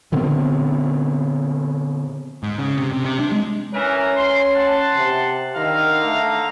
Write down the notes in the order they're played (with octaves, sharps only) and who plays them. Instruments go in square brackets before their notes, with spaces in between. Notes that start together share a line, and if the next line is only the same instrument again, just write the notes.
[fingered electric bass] A#2 D3 B3 C4
[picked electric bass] G#2
C#3
C3
C3
C3
D4
G#3
[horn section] E3 A#4 B4 [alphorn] C#4
[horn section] C6
F#5 A5 C6
[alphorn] C3
[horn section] D3 F5 A#5 [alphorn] D#3
[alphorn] A3